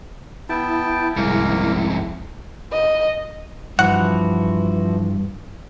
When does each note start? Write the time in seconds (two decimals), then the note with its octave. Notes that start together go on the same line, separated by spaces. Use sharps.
0.49 B3 E4 G5 A5
1.17 C2 F2 G#2 A#3
2.72 D#5
3.79 G2 E3 F3 F#4 F#5